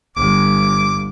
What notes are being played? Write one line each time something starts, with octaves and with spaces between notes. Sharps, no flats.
G1 D6